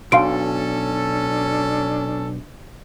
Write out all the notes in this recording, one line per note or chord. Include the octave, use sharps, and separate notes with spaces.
B1 C#4 D4 A4 F5 C6 D7